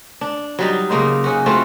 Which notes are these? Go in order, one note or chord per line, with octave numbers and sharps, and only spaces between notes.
D4
F#3 G3 D#4
C#3 A#3 D#4 C5
C#3 C#4 F#4
A3 C4 F4 F#4